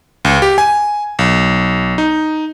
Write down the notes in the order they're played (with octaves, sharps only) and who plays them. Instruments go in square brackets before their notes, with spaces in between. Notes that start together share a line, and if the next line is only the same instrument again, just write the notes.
[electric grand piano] C#2
G4
G#5
B1
D#4